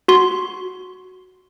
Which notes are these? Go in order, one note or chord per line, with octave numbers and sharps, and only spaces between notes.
F#4 C6